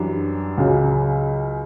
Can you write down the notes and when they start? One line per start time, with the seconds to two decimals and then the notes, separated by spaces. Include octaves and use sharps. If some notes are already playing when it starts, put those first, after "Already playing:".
Already playing: F#2 E3 G3 D4
0.58 C#2 C#3 F#3